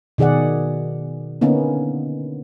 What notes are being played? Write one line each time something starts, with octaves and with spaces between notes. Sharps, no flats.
B2 D#3 G#4 D5 F#5
D3 A#3 B3 C#4 D#4